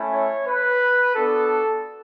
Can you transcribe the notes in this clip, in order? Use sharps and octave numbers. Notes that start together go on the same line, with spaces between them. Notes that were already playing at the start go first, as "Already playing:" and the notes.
Already playing: A3 C#4 E4
C#5
B4
B3 D4 F#4 A4